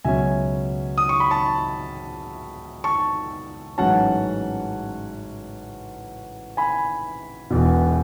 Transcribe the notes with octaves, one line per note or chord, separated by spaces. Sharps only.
C#2 B2 F#3 C#4 E5 G#5
D#6
C#6
B5
A5 C#6
A5 C#6
A1 G#2 F#3 C#4 F#5 A5
G#5 B5
E1 E2 B2